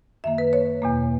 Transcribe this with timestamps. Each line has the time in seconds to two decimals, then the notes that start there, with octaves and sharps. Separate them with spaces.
0.24 F#2 D#3 A#3 E5
0.38 B4
0.53 C#5
0.82 E2 B2 A#3